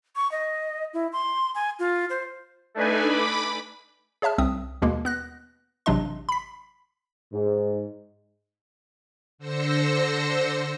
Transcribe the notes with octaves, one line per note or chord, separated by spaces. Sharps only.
C#6
D#5
E4
C6
G#5
F4
C5
A3 D4 D#4 B4 G#5
B5 D6
G#4 C#5 E5 A5 F6
C2 C4 E5 D#6
D#2 B2 G#3 A#3
B3 F#6 A#6
A1 C3 F#3 D4 D#5 C6
B5 B6
G#2
D3 C5 E6 A#6 C#7